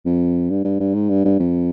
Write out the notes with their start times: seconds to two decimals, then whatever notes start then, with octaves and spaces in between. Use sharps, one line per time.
0.05 F2
0.50 G2
0.65 G2
0.80 G2
0.94 G#2
1.09 G2
1.24 G2
1.39 F2